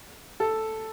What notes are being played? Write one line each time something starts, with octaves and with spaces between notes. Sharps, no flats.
A4